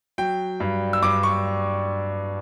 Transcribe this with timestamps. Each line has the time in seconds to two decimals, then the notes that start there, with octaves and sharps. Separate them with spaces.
0.18 F#3 G5
0.60 G2
0.93 E6
1.02 G2 D6
1.23 C#6